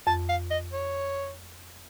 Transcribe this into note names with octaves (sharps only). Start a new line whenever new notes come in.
F2 A5
F5
D#5
C#5